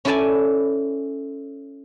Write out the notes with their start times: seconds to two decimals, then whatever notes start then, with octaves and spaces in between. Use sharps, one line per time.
0.05 C#4 E4 A4 D5 G#5 A5